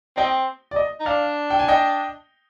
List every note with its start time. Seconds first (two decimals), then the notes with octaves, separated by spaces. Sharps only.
0.17 C4 D#5 G5
0.71 D5
0.76 D#5
1.00 D#4
1.05 D4 D5 F5
1.50 G5
1.59 G#5
1.68 D#5 G5